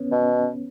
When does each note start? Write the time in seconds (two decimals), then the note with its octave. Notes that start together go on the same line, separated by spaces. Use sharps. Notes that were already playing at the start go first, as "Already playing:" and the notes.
Already playing: B3 C#4
0.12 B2